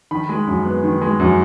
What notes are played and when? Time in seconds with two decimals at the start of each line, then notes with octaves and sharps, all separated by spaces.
0.11 D#3 B5
0.29 G#3
0.47 F#2
0.65 B3
0.83 D#3
1.02 G#3
1.20 F#2